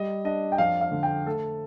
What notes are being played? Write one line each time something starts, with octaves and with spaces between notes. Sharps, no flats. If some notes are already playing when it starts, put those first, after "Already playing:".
Already playing: G3 D#5
D4 D#5
G5
F2 F5
F5
D3
G5
A3 A4